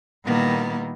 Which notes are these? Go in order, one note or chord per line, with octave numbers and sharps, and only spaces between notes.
A#2 D#3 G3 A#3 B3 E4